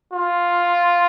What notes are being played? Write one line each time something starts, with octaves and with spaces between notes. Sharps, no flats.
F4